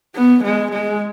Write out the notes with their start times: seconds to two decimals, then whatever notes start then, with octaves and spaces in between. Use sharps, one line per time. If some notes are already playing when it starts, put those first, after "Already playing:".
0.15 B3
0.44 G#3
0.72 G#3